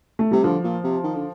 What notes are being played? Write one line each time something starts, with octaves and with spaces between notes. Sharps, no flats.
A3
C3 G3
D3 F3
A#2
C3
D#3
D3